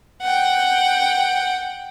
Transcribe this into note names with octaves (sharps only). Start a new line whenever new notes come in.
F#5 G5